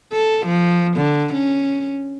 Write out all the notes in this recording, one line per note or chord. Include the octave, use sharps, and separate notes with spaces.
A4
F3
D3
C#4